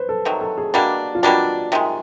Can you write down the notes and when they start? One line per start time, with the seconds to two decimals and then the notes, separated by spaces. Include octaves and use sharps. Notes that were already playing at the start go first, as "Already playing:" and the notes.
Already playing: B4 C5
0.09 A4
0.25 C3 D#3 F#3
0.41 A4
0.58 G#4
0.74 B2 G3 A#3 D4 F#4
1.15 F4
1.22 B2 G3 A#3 D4 F#4
1.72 C3 D#3 G#3